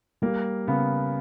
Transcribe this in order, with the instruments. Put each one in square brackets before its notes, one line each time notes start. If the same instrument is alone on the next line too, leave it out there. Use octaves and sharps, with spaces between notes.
[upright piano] G3 [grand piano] A#3
[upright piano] C#3 [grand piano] B3